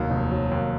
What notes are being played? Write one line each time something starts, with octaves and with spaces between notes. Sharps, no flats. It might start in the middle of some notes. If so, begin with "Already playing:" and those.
Already playing: F1 D#2 D#3 F#3
F1
F#3
D#2